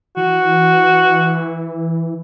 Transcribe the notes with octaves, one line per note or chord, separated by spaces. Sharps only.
E3 F#4